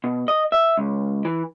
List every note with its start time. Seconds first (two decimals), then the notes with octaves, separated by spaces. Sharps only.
0.04 B2
0.28 D#5
0.52 E5
0.77 C#2
1.25 E3